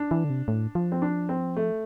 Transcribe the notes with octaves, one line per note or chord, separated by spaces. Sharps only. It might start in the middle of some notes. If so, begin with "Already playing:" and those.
Already playing: D4
E3
D3
C3
A2
F3
C4
D4
C4
A3